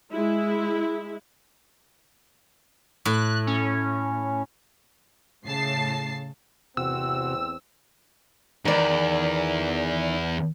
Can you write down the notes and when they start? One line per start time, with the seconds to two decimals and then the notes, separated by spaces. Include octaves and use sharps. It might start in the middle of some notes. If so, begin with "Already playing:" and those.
0.13 G#3 E4
3.05 A2 F#6
3.47 C#4
5.44 A2 C#3 A5 C7
6.77 A1 E2 C3 C4 F#4 E6
8.65 E2 D#3 D5